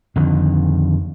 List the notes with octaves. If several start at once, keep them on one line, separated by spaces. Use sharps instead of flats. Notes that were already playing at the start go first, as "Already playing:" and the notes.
F2 D3 D#3